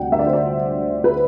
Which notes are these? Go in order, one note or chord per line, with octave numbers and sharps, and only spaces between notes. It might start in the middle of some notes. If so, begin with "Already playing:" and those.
Already playing: D2 C3 G3 D4 F#5 G5
E5
D5
C5
D5
B4